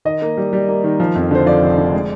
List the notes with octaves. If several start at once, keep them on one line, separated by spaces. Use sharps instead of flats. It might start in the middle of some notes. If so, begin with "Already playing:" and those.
D#3 D#5
A#3
G3
G3
A#3
D#3
F3
F2
D3 C5
F3 D5
F1
D3
G#3